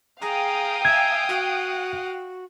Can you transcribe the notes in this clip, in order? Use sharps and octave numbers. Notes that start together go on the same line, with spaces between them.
G#4 F5 G5 A#5 D#6
E5 G#5 G#6
F#4 F#5